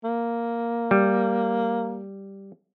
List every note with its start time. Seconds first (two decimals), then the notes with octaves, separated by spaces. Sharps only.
0.04 A#3
0.91 G3